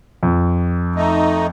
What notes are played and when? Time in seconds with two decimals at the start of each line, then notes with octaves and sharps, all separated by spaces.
0.23 F2
0.96 A3 D#4